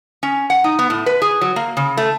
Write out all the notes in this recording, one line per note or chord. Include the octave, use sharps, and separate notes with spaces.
C#4
F#5
D#4
B3
A2
B4
G#4
F#3
A#3
C#3
A3